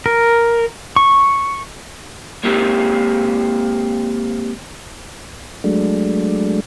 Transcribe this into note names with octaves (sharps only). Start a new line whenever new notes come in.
A#4
C#6
G#3 A#3 C4 G4 A#4
F#3 G#3 A3 D4